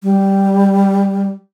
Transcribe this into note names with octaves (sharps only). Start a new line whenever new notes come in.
G3